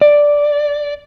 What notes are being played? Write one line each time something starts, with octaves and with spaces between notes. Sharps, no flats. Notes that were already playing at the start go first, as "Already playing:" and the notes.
D5